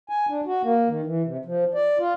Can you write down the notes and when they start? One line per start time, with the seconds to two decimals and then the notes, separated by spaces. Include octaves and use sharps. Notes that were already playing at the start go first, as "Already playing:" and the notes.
0.09 G#5
0.29 D4
0.46 F#4
0.64 A#3
0.89 D#3
1.05 E3
1.24 C3
1.45 F3
1.74 D5
1.99 F4